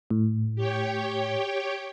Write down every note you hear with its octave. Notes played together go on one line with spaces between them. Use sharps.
A2
G4 C#5 G5